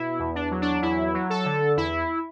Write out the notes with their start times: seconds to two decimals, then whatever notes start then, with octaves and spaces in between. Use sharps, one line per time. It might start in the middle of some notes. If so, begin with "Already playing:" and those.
Already playing: B2 E4
0.19 E2
0.35 D4
0.51 F#3
0.62 D4
0.82 E2 E4
1.14 F#3
1.30 A4
1.45 D3
1.77 E2 E4